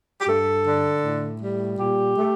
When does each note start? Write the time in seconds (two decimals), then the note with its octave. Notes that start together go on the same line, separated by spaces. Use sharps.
0.21 G4
0.27 G2 A4
0.65 D3
1.03 A2
1.40 G3
1.79 A#2 G4
2.17 A3